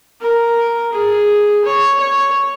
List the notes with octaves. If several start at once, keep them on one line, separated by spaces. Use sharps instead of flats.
A#4
G#4
C#5
C#5